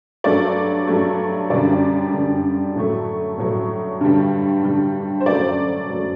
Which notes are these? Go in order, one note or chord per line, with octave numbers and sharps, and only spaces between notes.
G2 F#3 A3 D5
G2 F#3 A3
F#2 D3 G3 D5
F#2 D3 G3
A2 F#3 A3
A2 F#3 A3
G2 D3 G3
G2 D3 G3
C5
F#2 F#3 A3 D5
F#2 F#3 A3